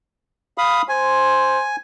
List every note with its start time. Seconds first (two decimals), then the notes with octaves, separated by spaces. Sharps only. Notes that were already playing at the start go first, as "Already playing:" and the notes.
0.58 F5 B5 D#6
0.89 C5 G#5